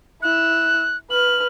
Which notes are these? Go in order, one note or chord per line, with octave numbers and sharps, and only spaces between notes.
E4 E6 F#6
B4 F6 F#7